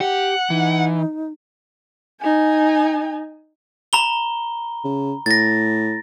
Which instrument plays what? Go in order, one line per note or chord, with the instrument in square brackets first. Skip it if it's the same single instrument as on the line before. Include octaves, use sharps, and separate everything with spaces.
[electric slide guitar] G4 [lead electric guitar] F#5
[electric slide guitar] E3 [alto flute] D#4
[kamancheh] D#4 G#5
[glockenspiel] A#5 B5 G7
[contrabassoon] C#3
[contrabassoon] A2 [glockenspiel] A6 A#6